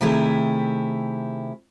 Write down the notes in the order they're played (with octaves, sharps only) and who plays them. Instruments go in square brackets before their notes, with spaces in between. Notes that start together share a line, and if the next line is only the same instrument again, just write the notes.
[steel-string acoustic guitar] C3 D#3 A3 E4 G4 G#4